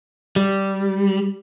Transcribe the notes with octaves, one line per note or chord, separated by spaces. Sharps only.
G3